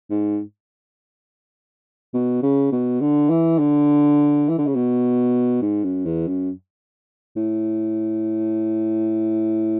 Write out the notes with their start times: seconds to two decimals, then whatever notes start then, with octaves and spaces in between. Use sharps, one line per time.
0.10 G#2
2.14 B2
2.43 C#3
2.72 B2
3.01 D3
3.30 E3
3.59 D3
4.49 E3
4.58 D3
4.67 C#3
4.75 B2
5.62 G#2
5.84 F#2
6.06 E2
6.28 F#2
7.36 A2